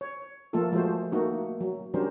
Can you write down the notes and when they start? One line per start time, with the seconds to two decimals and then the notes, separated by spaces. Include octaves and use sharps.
0.01 C#5
0.53 F3 A3 A#3 F4 A4
0.72 F3 G#3 A3 F#4 C5
1.12 A3 A#3 D#4 F#4
1.61 F#3
1.94 F#3 G3 C#4 D4 A#4 C5